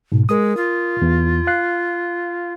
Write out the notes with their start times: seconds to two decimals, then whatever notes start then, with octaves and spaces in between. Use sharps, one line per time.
0.12 G#2 B2
0.29 G#3 A#4 D#6
0.57 F4
1.02 E2
1.47 F5 F#6 C7